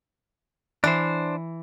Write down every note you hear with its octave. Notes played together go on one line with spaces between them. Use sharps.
E3 D4 C5